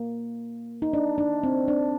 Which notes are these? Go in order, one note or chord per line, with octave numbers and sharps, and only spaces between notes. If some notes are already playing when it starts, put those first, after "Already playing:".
Already playing: A#3
D#4
D4
D4
C4
D4